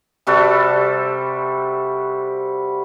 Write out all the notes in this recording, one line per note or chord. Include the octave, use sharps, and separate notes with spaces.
C3 G3 F#4 A4